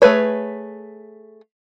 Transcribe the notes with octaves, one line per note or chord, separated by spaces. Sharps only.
A3 G#4 B4 C#5